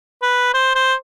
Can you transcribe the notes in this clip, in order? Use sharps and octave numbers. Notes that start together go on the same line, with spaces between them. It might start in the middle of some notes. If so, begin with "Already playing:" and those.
B4
C5
C5